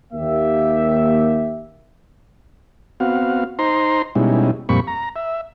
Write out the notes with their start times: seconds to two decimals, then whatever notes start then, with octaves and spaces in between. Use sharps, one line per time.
0.13 D#2 A#3 G4 E5
3.00 B3 C4 F#4 F5
3.59 D#4 C5 A#5 C6
4.15 B2 G3 G#3 C#4 D#4 E4
4.69 F2 A#2 G3 C4 B5 C#6
4.87 A#5
5.16 E5